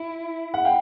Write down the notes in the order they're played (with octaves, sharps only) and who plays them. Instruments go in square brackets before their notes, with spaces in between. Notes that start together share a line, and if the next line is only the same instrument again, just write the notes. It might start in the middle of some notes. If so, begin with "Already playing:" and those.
Already playing: [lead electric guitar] E4
[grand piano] F#5
F5 G5